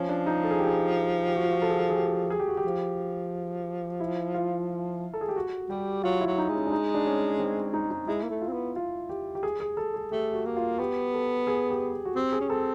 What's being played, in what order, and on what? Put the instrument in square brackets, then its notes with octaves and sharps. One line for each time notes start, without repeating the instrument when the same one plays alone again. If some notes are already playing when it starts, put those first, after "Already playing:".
Already playing: [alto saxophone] F3 [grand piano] C#4
[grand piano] D4
D#4
A4
G#4
G4
G#4
G4
F#4
F4
F#4
A4
G#4
A4
G#4
G4
G#4
G4
F#4
G4
[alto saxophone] F3
[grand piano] E4
F4
A4
G#4
G4
F#4
[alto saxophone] G3 [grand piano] G4
[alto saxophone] F#3 [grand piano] F4
[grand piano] E4
[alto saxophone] F#3
[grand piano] D#4
[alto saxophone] G#3
[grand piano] C#4
D4
D#4
D4
C#4
C4
D#4
D#4
[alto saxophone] G#3 [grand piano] E4
[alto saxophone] A#3
A3
[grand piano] F4
[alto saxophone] C4
B3
[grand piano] F4
G4
G4
G#4
G#4
A4
G#4
[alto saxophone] A3 [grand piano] G4
[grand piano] F#4
[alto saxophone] A#3
[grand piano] F4
[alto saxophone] B3 [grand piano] G4
[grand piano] A4
G#4
G4
F#4
[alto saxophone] C4 [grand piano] G4
[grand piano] G#4
[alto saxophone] C#4
[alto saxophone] C4 [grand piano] A4